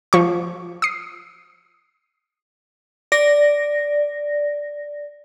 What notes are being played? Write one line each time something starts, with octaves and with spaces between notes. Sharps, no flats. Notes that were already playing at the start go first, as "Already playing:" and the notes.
F3 C#6
D#6 C7
D5 A#6